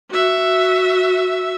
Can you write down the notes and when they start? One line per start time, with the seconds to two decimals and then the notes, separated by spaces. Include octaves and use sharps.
0.10 F#4 E5